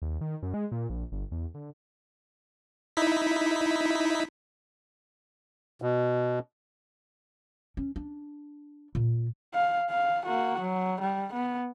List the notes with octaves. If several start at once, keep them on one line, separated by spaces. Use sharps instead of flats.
D#2
D#3
F#2
G#3
A#2
A#1
G1
E2
D3
D#4 E4 B6
B2
C#4
D4
A#2
F5
F5
A#3 F#4
F#3
G3
B3